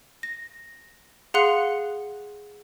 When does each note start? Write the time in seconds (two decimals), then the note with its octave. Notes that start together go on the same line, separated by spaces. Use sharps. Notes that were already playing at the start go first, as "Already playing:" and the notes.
0.23 A#6
1.34 G#4 F5 F#5 C6 F#6 C#7